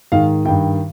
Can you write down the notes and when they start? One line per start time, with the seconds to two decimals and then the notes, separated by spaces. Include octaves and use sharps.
0.12 G#2 D#3 F5
0.45 G2 D#3 G5